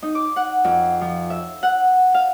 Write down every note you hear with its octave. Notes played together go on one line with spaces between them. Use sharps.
D#4
D6
F#5
F2
F3
E5
F#5
F5